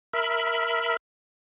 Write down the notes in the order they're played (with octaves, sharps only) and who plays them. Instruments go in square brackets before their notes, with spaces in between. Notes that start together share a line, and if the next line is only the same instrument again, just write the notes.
[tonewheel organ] A#4 E5 B5